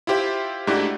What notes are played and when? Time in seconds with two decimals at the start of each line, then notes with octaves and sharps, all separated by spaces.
0.07 E4 F4 G4 C5 E5
0.67 G#2 A3 D4 E4 F#4 G4